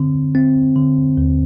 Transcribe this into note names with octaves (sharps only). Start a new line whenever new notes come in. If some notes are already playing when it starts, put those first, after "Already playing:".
Already playing: D3 C4
C4
D3
D#2